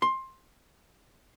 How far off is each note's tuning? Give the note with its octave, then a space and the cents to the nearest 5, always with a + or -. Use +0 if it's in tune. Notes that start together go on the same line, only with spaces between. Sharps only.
C6 +15